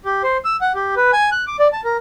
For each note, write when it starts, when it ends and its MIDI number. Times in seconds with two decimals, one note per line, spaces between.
0.05 0.22 67
0.24 0.37 72
0.45 0.56 88
0.61 0.72 78
0.75 0.95 67
0.97 1.11 71
1.13 1.30 80
1.32 1.45 90
1.47 1.57 86
1.59 1.68 74
1.73 1.81 81
1.85 1.97 70